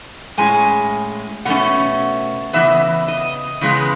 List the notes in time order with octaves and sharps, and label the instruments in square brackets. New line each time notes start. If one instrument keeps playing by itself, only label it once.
[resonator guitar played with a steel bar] A2 G#3 C#4 G#5
B2 A3 C#4 F#5
C#3 E3 B3 E5
D#5
C#3 E3 G#3 B3